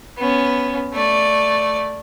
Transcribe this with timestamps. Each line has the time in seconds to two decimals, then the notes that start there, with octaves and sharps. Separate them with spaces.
0.18 B3 C#4
0.93 A3 D5